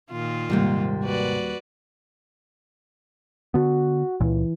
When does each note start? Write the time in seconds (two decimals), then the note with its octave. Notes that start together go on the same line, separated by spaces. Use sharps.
0.11 A#2 D#3 F4
0.50 D#2 G#2 C3 G3 A#3
1.03 F#4 B4 D5
3.54 D3 B3 F#4
4.20 C#2 A#2 E3